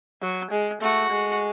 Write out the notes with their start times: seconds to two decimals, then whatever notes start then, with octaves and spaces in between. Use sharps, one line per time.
0.22 F#3
0.51 G#3
0.81 A3 F#4
1.10 G#3